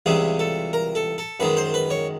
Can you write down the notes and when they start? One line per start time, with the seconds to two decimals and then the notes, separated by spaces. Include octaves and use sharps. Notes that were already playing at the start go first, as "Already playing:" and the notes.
0.06 C#2 C3 E3 G3 G#4
0.39 A4
0.73 A#4
0.95 A4
1.18 A4
1.40 F#2 D#3 G#3 B4
1.57 C5
1.74 B4
1.90 C#5